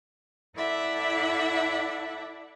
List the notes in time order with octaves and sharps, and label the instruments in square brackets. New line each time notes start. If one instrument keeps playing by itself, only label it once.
[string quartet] E4 A4 D5 E5 F#5